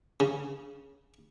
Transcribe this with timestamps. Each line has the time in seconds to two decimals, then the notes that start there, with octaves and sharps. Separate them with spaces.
0.20 C#3